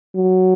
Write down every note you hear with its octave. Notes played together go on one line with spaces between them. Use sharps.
F#3